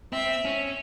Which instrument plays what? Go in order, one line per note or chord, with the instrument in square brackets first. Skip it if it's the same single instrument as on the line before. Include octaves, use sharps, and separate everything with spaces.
[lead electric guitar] C4 [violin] E5
[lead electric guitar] C#4